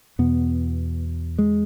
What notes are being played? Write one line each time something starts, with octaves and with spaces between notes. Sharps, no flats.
E2 B2 B3
G#3